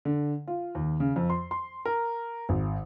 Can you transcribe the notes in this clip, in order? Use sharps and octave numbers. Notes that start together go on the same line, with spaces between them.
D3
F4
D#2
C#3
F2
C6
C6
A#4
G#1